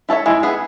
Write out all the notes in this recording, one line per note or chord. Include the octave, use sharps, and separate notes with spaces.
E4 A4 C#5 E5
G#3 E4
B3 E4 G#4